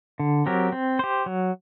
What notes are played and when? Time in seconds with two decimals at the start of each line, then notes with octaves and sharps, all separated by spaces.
0.20 D3
0.46 F#3 C4 G4 A#4
0.72 C4
0.99 G4 C5
1.26 F#3